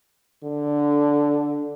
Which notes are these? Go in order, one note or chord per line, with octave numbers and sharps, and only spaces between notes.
D3